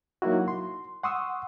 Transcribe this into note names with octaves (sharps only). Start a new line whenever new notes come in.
F#3 A#3 D#4 E4 F#4
C6
F#5 C6 C#6 D#6 E6